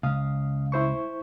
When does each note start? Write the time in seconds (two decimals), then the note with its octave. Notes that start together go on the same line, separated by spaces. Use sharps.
0.03 C#2 F5 D#6
0.72 E4 C5 C#6